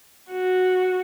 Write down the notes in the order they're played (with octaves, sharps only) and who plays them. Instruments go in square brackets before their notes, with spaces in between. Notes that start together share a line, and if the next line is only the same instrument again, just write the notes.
[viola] F#4